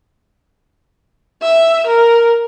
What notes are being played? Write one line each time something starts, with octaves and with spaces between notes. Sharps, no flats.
E5
A#4